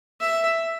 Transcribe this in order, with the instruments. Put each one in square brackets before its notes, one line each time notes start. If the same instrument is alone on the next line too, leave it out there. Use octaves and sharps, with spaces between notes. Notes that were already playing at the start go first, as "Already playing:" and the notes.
[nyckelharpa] E5